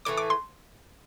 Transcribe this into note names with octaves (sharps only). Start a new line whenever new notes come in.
A2 E3 A3 D6
D6
C6